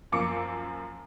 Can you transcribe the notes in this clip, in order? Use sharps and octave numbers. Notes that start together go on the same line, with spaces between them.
F#2 F3 A#3 F5 D6 C#7